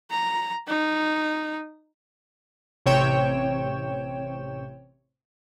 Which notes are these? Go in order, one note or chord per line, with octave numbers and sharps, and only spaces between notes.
A#5
D#4
A1 C3 C#5 G5 E7